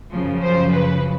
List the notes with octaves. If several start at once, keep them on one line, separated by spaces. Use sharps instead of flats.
F#2 C#3 F3
C5
B4